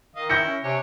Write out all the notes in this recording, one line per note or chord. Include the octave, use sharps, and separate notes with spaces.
D#3 D#5 F5
E4 G6 A#6 C#7
C#4
C3 D4 C#5 G#5